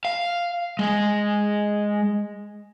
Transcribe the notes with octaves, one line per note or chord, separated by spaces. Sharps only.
F5
G#3